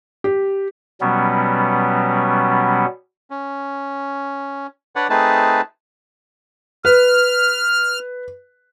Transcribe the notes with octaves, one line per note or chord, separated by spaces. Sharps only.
G4
B2 F#3 G3 B3 C#4
C#4
D4 B4 C#5 D5 F#5
A3 C4 D#4 G#4 B4 A5
B4 F6